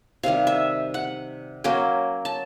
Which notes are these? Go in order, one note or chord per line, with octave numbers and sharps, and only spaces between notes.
C3 D#3 G3 F5
E5
F#5
F#3 A#3 C#4 G5
A5